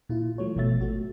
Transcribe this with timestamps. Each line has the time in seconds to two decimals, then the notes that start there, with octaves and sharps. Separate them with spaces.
0.09 A#2 E4 F4
0.38 E3 F#3 A3 C#5
0.56 G#1 B2 F3 A3 E5 A6
0.81 A3 F#4